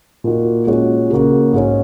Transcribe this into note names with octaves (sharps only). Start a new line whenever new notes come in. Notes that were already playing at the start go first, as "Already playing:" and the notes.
A#2 A#3 D#4 F#4
A#2 G#3 C#4 F#4
C#3 A#3 F#4
G#2 G#3 C#4